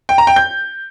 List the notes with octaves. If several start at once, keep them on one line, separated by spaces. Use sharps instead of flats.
G5
A#5
G5
G6